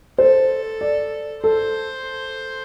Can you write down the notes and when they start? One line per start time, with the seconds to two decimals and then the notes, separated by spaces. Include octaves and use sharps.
0.18 A4 C5
0.81 D5
1.44 A4 C5